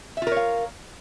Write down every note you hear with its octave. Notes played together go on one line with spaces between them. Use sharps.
F4 A#4 C#5 E5 F5